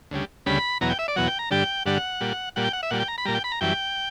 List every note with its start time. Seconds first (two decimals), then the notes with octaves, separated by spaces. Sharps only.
0.11 D2 C#3 G3
0.46 D2 C#3 G3 B5
0.81 E2 B2 F#3 A#5
0.90 G5
0.99 E5
1.08 D5
1.16 E2 B2 F#3 F#5
1.28 G5
1.39 A#5
1.51 G2 D3 G3 G5
1.86 G2 D3 G3 F#5
2.21 A#2 G3
2.56 A#2 G3 F#5
2.64 G5
2.73 F#5
2.83 E5
2.91 A#2 G3 F#5
3.00 G5
3.08 A#5
3.18 B5
3.25 A#2 G3 A#5
3.35 G5
3.44 B5
3.52 A#5
3.61 F#2 E3 G3 G5